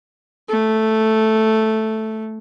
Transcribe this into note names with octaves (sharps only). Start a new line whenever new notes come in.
A3